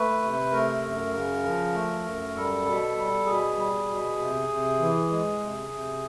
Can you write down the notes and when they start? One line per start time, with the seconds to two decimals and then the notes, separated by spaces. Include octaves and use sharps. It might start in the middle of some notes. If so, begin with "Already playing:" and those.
Already playing: A3 B4
0.22 C3
0.52 A3 A#4
0.83 F#2
1.13 C#3
1.44 F3
1.74 A3
2.05 F#2
2.35 G3 A4
2.65 B2
2.96 G3
3.26 B2 G#4
3.57 G3
3.87 B2
4.18 C3
4.49 C3
4.79 E3
5.09 G#3
5.39 C3
5.70 C3